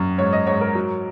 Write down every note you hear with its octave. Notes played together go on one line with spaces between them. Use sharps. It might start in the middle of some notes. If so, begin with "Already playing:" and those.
Already playing: F#2
G#2 C#5
D#5
G#2 C#5
A#4
F#3